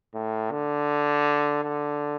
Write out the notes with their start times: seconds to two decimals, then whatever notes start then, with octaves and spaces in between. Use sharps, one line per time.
0.14 A2
0.51 D3
1.63 D3